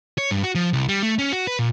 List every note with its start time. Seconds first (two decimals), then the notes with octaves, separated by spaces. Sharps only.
0.18 C#5
0.31 G2
0.43 F#4
0.55 F3
0.73 C2
0.88 G3
1.03 A3
1.19 C#4
1.32 F#4
1.47 B4
1.59 A#2